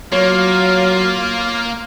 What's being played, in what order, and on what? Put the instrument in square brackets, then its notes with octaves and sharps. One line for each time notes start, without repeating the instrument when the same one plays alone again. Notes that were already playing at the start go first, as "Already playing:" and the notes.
[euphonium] F#3 [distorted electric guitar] A#3 [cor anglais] F4 [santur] C#5